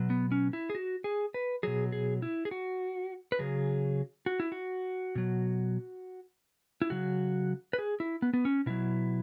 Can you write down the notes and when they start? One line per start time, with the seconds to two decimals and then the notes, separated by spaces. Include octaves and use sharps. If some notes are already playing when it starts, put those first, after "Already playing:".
Already playing: B2 F#3
0.10 B3
0.32 C#4
0.53 E4
0.70 G#4
0.75 F#4
1.04 G#4
1.34 B4
1.63 B2 F#3 G#4
1.92 G#4
2.22 E4
2.45 G#4
2.51 F#4
3.32 B4
3.39 C#3 F#3 G#4
4.26 F#4
4.40 E4
4.52 F#4
5.15 B2 F#3
6.82 E4
6.90 C#3 F#3 F#4
7.73 B4
7.79 G#4
8.00 E4
8.22 B3
8.33 B3
8.45 C#4
8.66 B2 F#3 E4